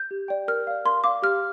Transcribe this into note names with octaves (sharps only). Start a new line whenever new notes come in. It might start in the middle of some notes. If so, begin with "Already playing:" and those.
Already playing: G6
G4
D5 G5
A#4 F6
D5 F5
A#4 C6
D5 F5 D6
G4 F6